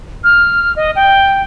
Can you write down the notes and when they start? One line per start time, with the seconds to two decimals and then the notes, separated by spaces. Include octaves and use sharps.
0.24 F6
0.76 D#5
0.96 G5